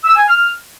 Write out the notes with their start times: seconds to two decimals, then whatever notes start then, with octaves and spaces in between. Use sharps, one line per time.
0.04 E6
0.15 G#5
0.27 F6